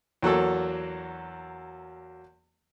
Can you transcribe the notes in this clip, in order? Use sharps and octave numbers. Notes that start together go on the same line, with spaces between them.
E2 F#3 A#3 A4